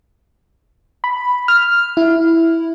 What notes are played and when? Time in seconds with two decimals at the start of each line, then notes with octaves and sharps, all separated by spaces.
1.04 B5
1.48 F6
1.97 E4